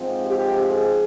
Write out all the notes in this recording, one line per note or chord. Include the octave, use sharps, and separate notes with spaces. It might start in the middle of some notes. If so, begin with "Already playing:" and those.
Already playing: G#2 F3 C4
G4
G#4